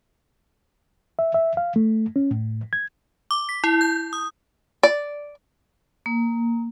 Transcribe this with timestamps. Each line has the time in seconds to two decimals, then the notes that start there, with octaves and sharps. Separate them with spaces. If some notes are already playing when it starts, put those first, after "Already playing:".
1.19 E5
1.34 E5
1.57 F5
1.76 A3
2.16 C#4
2.31 A2
2.73 G#6
3.31 D6
3.49 B6
3.64 E4
3.81 G6
4.13 D#6
4.83 D5
6.06 A#3